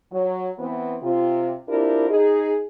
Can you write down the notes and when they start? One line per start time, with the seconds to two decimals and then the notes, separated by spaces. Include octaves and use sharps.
0.12 F#3
0.59 E3 B3 C4
1.02 C3 F4
1.68 C4 D4 E4 F4 G4 A#4
2.09 D#4 G#4